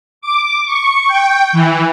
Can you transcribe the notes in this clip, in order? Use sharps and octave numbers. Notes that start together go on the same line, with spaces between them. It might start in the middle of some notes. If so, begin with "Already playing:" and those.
D6
C#6
G5
E3